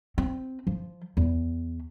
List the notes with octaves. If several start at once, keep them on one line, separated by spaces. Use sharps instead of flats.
C4
F3
E2